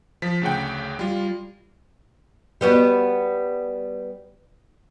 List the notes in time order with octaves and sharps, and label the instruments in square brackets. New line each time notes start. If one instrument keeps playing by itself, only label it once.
[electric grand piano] F3 B6
D2 C#3 F#5 G5
G3 F4
[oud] G3 B3 F#4